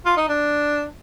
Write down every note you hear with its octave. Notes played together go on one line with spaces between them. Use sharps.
F4
D#4
D4